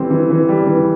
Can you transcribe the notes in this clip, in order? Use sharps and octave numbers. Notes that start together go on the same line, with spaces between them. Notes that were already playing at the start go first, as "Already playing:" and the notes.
Already playing: E3 G3 C4
E3
E3
G3
E3